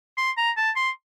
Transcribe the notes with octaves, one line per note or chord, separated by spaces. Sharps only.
C6
A#5
A5
C6